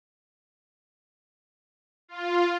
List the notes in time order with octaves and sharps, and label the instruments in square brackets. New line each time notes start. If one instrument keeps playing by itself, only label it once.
[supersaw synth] F4